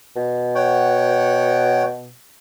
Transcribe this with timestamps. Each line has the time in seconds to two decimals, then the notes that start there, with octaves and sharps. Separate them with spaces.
0.16 B2
0.55 C#5 F#5 G5